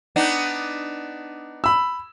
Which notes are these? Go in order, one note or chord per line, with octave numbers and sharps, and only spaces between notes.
B3 D4 D#4
B5 E6